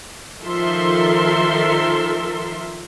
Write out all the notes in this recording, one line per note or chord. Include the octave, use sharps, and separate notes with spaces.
D#3 F3 A4 A#4 E5 C6